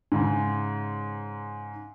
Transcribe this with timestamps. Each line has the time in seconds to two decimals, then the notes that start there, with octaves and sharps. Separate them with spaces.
0.12 G#2 C#3